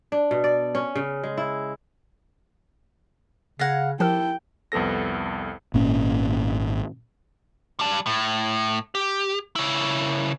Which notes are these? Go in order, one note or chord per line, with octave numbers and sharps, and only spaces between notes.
D4
B2
D5
C#4
C#3
G#3
E4
C#3 F5 F#5 G#6 A#6
F3 E4 G4 A4 A#4 G5
C2 F2 B3 A4 A#6
G#1 A#2 C#4
G3 A5
A2
G4
C#3 E4